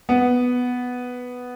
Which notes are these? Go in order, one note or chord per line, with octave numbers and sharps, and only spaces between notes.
B3